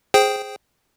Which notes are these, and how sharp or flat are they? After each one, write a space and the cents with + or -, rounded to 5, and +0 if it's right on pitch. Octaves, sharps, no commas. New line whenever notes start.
G#4 +0 C5 +5 G5 -5